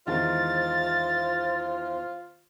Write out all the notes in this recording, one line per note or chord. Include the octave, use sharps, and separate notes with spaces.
E2 D#3 G#3 F4 C5 A6